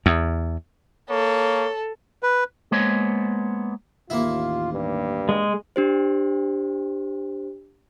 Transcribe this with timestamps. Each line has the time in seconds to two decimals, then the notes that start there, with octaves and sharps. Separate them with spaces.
0.06 E2
1.10 A#3 A4 C#5
2.23 B4
2.72 G#3 A#3 B3 C5 C#5 D#5
4.10 A1 D#2 A#3 E4 F4
4.73 G2
5.29 G#3
5.76 D4 G4 C5